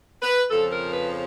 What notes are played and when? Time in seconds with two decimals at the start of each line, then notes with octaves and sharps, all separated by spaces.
0.22 B4
0.51 F2 C#3 F3 A4
0.72 A#4
0.94 B4